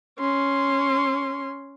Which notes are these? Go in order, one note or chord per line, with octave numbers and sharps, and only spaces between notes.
C#4 C6